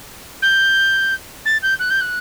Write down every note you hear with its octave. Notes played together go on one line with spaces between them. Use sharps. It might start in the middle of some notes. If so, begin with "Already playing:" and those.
G6
A6
G6
F#6
G6
F#6